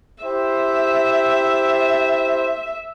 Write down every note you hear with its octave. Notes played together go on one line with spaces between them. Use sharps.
E4 G4 C5 E5